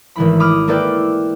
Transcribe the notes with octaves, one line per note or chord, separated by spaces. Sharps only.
G#1 E3 A3 E4 B5
B5 D6 D#6 F6
A#3 E4 A4 B4 D5 G5